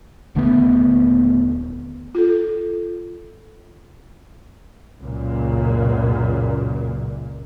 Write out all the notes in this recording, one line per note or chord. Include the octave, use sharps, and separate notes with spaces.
D#1 D3 A3 B3
F4 A4
C#2 F#2 A#2